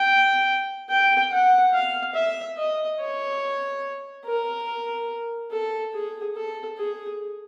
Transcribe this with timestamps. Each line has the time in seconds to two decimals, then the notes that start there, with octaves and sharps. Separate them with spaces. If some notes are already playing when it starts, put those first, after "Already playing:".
Already playing: G5
0.89 G5
1.31 F#5
1.73 F5
2.15 E5
2.58 D#5
3.00 C#5
4.25 A#4
5.51 A4
5.94 G#4
6.36 A4
6.78 G#4